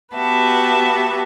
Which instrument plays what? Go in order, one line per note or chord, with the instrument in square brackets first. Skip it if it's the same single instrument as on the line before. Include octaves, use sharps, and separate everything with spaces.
[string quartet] B3 F#4 G4 B4 E5 A5